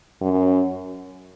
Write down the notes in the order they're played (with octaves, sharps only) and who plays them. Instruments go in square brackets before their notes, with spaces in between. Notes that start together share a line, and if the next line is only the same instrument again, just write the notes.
[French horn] F#2